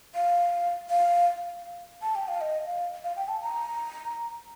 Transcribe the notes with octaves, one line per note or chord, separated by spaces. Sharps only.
F5
F5
A5
G5
F5
D#5
F5
F5
G5
A5
A#5